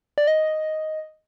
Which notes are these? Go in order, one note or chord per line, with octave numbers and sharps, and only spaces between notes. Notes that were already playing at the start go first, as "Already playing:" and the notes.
D5
D#5